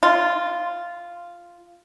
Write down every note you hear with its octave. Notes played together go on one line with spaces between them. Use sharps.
F4